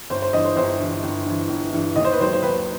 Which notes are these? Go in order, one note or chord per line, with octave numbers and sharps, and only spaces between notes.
G1 C5
C5
G2 E3 D#5
C5
G1 C5
G2 E3
G1
G2 E3
G1
G2 E3
D#2 D#5
C5
B4
D#3 F#3 C5
C5
D#2 B4